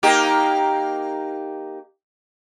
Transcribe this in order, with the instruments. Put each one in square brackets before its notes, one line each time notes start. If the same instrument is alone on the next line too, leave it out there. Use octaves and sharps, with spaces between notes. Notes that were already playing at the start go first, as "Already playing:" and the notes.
[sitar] A#3 D#4 G4